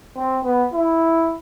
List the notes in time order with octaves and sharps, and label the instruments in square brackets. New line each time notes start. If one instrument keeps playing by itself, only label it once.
[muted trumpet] C4
B3
E4